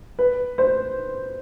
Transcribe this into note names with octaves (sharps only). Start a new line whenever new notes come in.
B4
C5